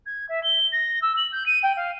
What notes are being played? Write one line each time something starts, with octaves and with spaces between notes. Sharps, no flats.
G#6
E5
G7
A#6
E6
F#7
G6
D#7
G5
F5